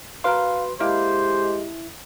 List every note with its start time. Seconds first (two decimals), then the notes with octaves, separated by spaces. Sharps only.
0.24 F#4 A#4 B4 F5 C6
0.80 G#3 A#3 E4 G4 C5 E5